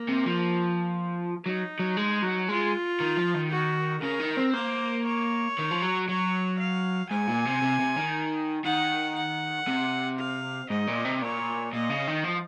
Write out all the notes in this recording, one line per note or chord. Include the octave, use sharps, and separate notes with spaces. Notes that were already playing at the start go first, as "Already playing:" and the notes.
Already playing: A#3
C3
F3
F#3 D#4
F#3
G#3
F#3
G#3 F4
D#3
F3
D#3
F#4
C#3 A#4
D#3
C4
A#3 C5
C#5
D#3
F3
F#3
F#3 C#5
F5
G#2 G#5
A#2
C3
C3
C3
D#3
D#3 F#5
F#5
C3
F5
G#2 D#5
A#2
C3
A#2 C#5
A#2 D#5
C#3
D#3
F3